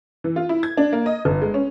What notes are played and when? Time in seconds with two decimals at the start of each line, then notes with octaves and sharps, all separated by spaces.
0.24 E3
0.36 F4
0.49 E4
0.63 G#6
0.77 D4
0.93 A#3
1.06 D#5
1.25 G1
1.42 G#3
1.54 C#4